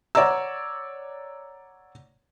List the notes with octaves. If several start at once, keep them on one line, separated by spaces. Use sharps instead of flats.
C#5 D5 F#5 A#5 E6